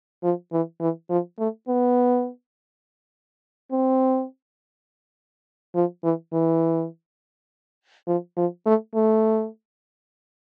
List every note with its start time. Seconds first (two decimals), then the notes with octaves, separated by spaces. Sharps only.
0.23 F3
0.52 E3
0.81 E3
1.10 F3
1.39 A3
1.68 B3
3.72 C4
5.75 F3
6.04 E3
6.33 E3
8.07 F3
8.37 F3
8.66 A3
8.95 A3